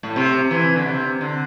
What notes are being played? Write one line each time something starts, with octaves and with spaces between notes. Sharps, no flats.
A2
C3
E3
D3
C3
D3